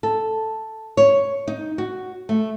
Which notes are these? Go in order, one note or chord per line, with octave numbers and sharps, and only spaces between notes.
A4
C#5
D#4
F#4
A3